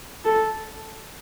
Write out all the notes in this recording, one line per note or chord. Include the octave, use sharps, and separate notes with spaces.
A4